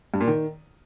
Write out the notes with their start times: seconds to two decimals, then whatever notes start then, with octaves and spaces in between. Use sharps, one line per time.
0.14 G2
0.21 A#2
0.27 D#3